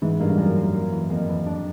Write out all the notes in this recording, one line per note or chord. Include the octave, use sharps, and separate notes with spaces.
G#2 E3
G2 A#3
G2
F#2 A#3
A#3
A#3
E3
F2 A#3
E3
D4